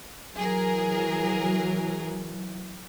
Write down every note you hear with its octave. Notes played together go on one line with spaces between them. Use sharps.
E3 F#3 G#4 A#4